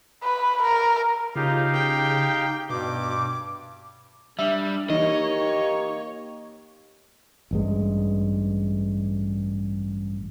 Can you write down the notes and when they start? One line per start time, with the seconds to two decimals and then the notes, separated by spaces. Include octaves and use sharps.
0.24 B4
0.62 A#4
1.35 C#3 D#4 F4 G4 F5
1.74 G5
2.70 G2 B2 D6
4.39 G3 D4 E5
4.90 E3 A#3 D#4 G4 C#5 D#5
7.51 A1 G2 G#3